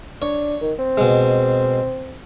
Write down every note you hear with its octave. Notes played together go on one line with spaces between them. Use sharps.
D4 C#5
D#3
C4
B2 G#3